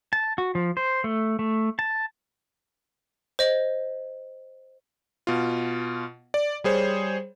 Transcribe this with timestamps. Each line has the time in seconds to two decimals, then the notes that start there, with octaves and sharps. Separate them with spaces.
0.13 A5
0.38 F#4
0.55 F3
0.77 C5
1.04 A3
1.39 A3
1.79 A5
3.39 C5 D#5
5.27 B2 F4
6.34 D5
6.64 G3 G#4 C5 C#5